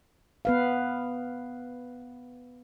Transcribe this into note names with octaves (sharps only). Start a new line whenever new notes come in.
B3 B4 F5